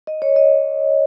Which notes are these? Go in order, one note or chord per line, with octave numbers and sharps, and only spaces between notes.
D#5
C#5
D#5